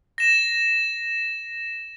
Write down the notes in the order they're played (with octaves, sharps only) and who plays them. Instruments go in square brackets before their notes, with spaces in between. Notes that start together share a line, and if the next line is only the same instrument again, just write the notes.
[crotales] A#6 E7